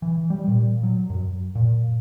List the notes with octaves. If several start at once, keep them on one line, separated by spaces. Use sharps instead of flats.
E3
G3
A#2
F#3
F#2
A#2